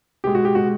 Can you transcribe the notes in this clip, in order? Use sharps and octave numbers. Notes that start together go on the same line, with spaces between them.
B2 G#3 G4
F#4
G4
B2 G#3 F#4